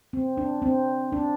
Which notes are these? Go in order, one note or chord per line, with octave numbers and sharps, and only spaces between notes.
C4
D4
C4
D4